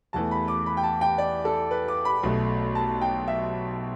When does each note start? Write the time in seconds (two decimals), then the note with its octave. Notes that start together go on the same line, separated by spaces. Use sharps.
0.13 E2 E3 A3 A5
0.31 B5
0.48 D6
0.66 B5
0.77 G5
0.83 A5
1.01 G5
1.18 D5
1.45 A4
1.71 B4
1.88 D6
2.05 B5
2.23 B1 B2 A3
2.75 A5
3.01 G5
3.28 E5